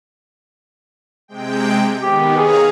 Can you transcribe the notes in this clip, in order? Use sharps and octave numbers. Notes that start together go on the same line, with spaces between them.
C3 G#3 G5
D#3 B3 G4
G#4 C#5 F5 A#5